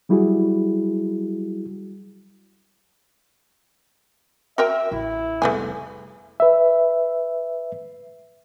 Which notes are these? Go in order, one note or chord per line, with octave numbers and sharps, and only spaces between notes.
F#3 G3 E4 F#4 G#4
F#4 A#4 E5 G5
A1 E4
F1 G3 A3 B3 G#4
B4 E5